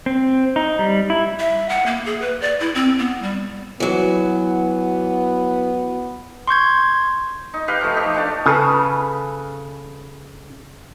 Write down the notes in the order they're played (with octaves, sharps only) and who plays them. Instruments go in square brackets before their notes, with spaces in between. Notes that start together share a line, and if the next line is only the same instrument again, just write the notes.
[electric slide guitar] C4
D#4
G3
E4
[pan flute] E5
F#5
A#3
G#4
B4
D5
E4
C4
B3
G3
[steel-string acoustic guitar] E3 F#3 [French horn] B3
[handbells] C6 C#6 G6 G#6
[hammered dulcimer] D#4
G4 B4 F5 G5
F3 A3
D#4 G4
A3 D4 D5
[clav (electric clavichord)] C#3 [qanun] A4 B4 A#5